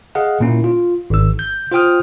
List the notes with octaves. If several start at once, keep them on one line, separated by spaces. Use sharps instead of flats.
G#4 D#5 F5 F#5
A#2 A#3 C#4 E4
F4
G#1 E6
G6
F4 C5 F5 G5 D#6 F6